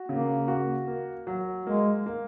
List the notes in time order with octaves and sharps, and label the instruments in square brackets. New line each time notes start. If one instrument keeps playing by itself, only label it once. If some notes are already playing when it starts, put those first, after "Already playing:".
Already playing: [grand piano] F#4
[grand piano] C#3 [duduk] A#3
[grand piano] F#4
A#3
F#3
[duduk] G#3 [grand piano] A#3
[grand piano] A#3